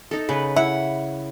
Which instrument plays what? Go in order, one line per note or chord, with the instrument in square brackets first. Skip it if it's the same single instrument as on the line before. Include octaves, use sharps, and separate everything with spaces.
[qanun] D#4 A4
[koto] C#3 [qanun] B4
[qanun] E4 [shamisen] E5 [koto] F#5